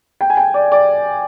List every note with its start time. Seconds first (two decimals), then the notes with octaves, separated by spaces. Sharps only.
0.21 G5
0.30 G#5
0.37 G5
0.54 D5
0.72 D5